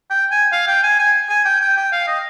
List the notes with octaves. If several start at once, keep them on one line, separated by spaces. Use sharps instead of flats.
G5
G#5
F5
G5
G#5
G#5
G#5
G5
G5
G5
F5
D#5